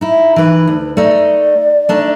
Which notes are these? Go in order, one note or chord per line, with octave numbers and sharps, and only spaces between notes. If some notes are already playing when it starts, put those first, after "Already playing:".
D#4 E4
E3 D#4 B4
D2
A3 D#4 D5
A3 D4 D#4